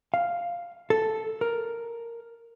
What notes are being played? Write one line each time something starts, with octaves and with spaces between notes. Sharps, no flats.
F5
A4
A#4